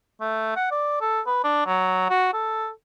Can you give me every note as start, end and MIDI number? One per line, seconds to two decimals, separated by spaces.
0.21 0.56 57
0.56 0.66 78
0.71 0.96 74
1.01 1.21 69
1.26 1.39 71
1.44 1.66 62
1.66 2.05 54
2.10 2.31 66
2.33 2.69 69